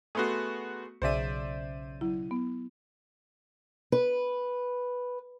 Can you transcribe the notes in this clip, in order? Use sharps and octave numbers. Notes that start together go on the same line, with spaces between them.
A3 B3 F#4 G#4 C6
B1 C#3 C5 D5 E5 D#7
F#3 E4
B3
B4